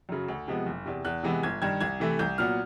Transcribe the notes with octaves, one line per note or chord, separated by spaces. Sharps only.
F#2 C#3 F#3
D2
C3 F3 G#3 B3
F#1
E2 C3
E2 F#6
C3 E3 G#3 B3
G1 G#6
G2 D#3 G#6
C2 G#6
C3 E3 A3
C2 G6
A#2 F#3 B3 F6